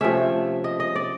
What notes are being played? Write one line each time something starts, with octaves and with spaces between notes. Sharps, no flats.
C3 F3 A3 C#4 E5
D#5
D#5
D5